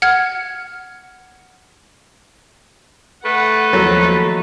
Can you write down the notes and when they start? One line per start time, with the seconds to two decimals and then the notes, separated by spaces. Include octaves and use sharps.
0.02 F#5 F6 G#6
3.25 A3 B4 F#5
3.73 D#2 F3 F#3